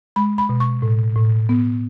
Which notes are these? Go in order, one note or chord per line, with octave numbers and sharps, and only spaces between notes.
G#3 B5
B5
B2
C#6
A2
A2
B3